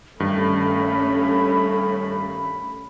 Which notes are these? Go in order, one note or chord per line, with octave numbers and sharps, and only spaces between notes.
G2 D#3 A3 C#4 B5